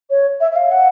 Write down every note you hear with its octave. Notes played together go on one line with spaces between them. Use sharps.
C#5
E5
E5
F5
F#5